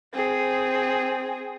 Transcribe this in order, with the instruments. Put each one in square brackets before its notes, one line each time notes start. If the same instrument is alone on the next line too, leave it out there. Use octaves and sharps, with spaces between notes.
[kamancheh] C4 G#4